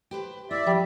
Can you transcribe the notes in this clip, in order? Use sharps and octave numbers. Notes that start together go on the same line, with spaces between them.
G4 B4 C5
E4 D5 E5
F3 G3